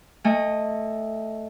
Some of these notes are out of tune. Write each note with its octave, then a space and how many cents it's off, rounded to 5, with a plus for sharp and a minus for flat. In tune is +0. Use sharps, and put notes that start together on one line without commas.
A3 +0 D#5 +0 G#5 -40